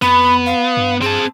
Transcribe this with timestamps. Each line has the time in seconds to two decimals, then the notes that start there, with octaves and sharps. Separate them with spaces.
0.02 F2 B3 B5
0.46 F5
0.77 G2
1.02 C4 G#4 A5